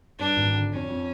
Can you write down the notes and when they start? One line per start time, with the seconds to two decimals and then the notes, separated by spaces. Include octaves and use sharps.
0.19 G2 D4
0.36 G#1
0.54 D3
0.72 F2 C#4
0.89 F2